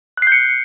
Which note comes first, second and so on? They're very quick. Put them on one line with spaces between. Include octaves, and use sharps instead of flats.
F#6 C7 G6 C#7